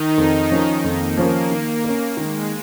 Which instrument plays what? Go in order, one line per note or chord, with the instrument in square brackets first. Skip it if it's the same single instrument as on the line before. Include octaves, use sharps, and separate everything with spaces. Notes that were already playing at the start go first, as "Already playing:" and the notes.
Already playing: [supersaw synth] D#3 D#4
[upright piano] F2
F3 C#4 A#4
[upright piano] F2 [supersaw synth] A#3
[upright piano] F3 C#4 A#4
D#3
C#4 A#4
[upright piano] D#3 [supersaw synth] G#3